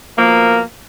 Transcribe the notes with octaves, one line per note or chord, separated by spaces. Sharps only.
B2 F3 A#3